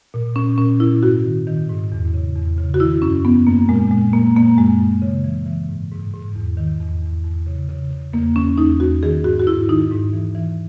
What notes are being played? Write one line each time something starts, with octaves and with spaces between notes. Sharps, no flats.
A#2
A#2 C#4
A#2 C#4
A#2 E4
G#2 F#4
D#3
D#3
G#2
E2
C#3
E2
C#3
F#4
D#3 E4
F#2 C#4
F#2 B3
F#2 A#3
A#2 G#3
A#2 G#3
A#2 A#3
A#2 A#3
F#2 G#3
F#2
C#3
E3
E3
G#2
G#2
G#2
E2
D#3
E2
E2
E2
C#3
C#3
C#3
E2 A#3
E2 C#4
E2 D#4
E2 F#4
D#3 G#4
G#2 F#4
F#4
G#2 E4
D#3 D#4
G#2
E3
E3